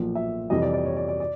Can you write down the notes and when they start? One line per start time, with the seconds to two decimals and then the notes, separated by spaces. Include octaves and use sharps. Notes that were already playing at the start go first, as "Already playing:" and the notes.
Already playing: B1 A#2 F3
0.15 E5
0.50 F2 C3 E3 G3 D#5
0.62 D5
0.73 D5
0.85 C#5
0.97 D5
1.08 D5
1.20 D5